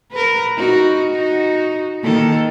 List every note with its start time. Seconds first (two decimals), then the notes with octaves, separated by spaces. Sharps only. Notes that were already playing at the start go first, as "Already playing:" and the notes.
0.11 A#4 B4
0.57 D#4 F#4
1.11 D#4 F#4
2.03 D#3 A#3 A4